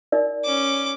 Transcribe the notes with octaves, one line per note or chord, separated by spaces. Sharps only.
D#4 A#4 D5
C#4 D6